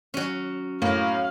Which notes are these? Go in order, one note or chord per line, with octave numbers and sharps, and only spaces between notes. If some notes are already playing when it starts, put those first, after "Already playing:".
F#3 C#4
A2 A#3 F5